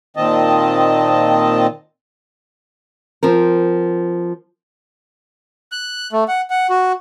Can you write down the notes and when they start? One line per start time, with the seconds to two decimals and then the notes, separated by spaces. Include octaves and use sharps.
0.17 A#2 D#3 C4 D#5 A5
3.23 F3 C4 A#4
5.72 F#6
6.13 A3
6.28 F#5
6.50 F#5
6.70 F#4